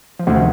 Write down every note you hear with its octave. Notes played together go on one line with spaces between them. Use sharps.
F3
D2 C3 D#3